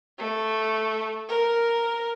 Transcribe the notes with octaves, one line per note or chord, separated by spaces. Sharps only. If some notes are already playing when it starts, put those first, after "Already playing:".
A3
A#4